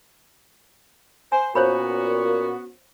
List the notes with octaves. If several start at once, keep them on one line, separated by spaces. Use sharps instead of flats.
C5 G#5
A#2 B3 C#4 F#4 C5 C#5 B5